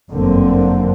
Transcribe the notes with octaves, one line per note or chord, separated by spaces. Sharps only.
G1 F#2 D3 A#3 C4